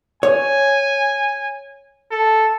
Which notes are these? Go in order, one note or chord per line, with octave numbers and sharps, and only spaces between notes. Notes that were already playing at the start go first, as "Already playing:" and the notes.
C#5 G#5
A4